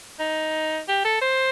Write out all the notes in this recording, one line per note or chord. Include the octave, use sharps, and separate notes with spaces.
D#4
G4
A4
C5